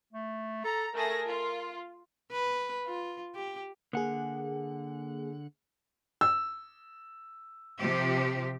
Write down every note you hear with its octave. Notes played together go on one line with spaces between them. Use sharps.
A3
A4 A#5
A3 G#4 A#4 A#6
F4
B4
F4
G4
D3 A#3 G#4 F#5
E6
C3 F3 G4